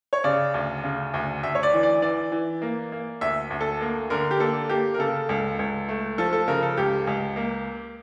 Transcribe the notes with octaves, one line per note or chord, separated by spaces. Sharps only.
C#5
C#3 D5
D2
C#3
D2
D2 E5
C#5
D5
E3
D5
E3 D5
E3
A#3
A#3
D2 E5
D2
A4
A#3
D3 A#4
G4
A#3 A4
A#3 G4
A#4
C#3 A4
C#2
C#2
A3
F3 A4
A4
C#3 A#4
A4
C#2 G4
C#2
A#3